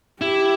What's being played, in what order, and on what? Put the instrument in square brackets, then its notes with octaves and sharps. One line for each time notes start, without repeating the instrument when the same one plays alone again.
[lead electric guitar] E4 [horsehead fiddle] G4